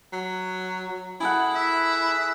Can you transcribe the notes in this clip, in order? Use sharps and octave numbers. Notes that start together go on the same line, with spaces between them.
F#3
E4 G#4 A4 F#5
E5